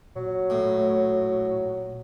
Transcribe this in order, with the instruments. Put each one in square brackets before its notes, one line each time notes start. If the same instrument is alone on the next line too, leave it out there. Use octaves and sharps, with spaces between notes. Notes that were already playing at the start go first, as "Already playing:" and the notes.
[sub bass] A#2 [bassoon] F#3
[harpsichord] A2